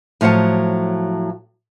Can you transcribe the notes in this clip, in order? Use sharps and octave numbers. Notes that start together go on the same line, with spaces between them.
A2 F3 F#3 F#5 A5